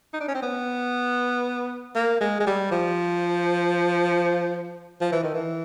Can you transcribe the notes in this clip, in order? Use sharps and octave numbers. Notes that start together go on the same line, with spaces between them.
D#4
D4
C#4
C4
B3
A#3
G#3
G#3
G3
F3
F3
E3
D#3
E3